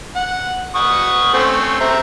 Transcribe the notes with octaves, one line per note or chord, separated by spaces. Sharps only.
F#5
F#5 C#6 D#6
A3 C4 C#4
C4 E5 A#5